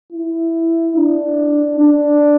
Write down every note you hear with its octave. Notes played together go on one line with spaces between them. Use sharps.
E4
D4
D4